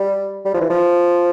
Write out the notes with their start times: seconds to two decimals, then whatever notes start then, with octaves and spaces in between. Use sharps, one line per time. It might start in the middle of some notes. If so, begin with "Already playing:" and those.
Already playing: G3
0.45 G3
0.54 F3
0.61 E3
0.70 F3